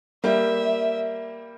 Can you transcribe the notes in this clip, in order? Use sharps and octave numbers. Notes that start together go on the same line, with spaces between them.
G3 A#3 E5